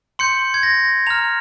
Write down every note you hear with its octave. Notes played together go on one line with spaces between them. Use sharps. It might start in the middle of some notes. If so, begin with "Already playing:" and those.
C6 G6 C#7
G#6
A#6
A#5 F6 F7